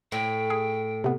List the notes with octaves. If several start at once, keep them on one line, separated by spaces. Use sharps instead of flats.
A2 G5
G#4
C3 B3